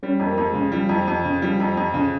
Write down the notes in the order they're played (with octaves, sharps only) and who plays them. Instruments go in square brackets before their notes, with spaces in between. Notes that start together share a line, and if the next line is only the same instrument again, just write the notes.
[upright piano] G3 [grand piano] C#4
[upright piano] F2
[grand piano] A#3
[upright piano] F2
[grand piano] G#3
[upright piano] C#3
[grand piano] F3 [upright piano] G3
[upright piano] F2
[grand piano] F3
[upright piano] F2
C#3
[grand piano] F3 [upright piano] G3
[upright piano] F2
F2
C#3